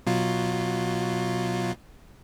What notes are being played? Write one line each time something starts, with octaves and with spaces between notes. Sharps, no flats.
B2 F#3 F4